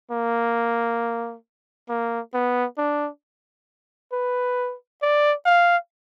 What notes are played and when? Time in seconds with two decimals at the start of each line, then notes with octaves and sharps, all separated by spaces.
0.11 A#3
1.89 A#3
2.34 B3
2.78 D4
4.13 B4
5.02 D5
5.46 F5